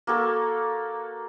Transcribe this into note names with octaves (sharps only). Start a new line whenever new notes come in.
A#3 F#4 A4 A#5